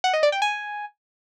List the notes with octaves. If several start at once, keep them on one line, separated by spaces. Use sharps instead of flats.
F#5
D#5
D5
G5
G#5